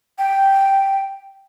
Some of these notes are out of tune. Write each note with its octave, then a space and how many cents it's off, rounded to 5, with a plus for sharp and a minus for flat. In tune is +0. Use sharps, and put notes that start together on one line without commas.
G5 -5